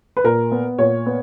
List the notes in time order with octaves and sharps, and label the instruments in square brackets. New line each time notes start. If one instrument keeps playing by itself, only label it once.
[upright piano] B4
A#2 A#4
B3
A#2 C#5
B3